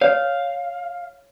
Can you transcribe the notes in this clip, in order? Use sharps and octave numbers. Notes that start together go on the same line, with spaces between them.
C#5 F5